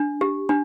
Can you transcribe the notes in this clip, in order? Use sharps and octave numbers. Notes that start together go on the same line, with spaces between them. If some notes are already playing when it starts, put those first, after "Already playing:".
Already playing: D4
G4
D4